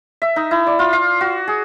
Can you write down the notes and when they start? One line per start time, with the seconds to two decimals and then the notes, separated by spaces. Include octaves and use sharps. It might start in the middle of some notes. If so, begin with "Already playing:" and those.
0.22 E5
0.36 D#4
0.51 E4
0.67 D5
0.79 F4
0.93 F5
1.21 F#4
1.48 G#4